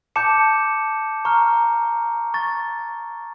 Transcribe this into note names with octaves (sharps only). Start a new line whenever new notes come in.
A5 D6 G6 C#7 E7
A#5 C#6 F6
C#6 A6